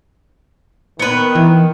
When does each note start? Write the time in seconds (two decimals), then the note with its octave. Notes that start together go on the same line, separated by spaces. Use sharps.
0.99 D#3 B3 B4
1.35 E3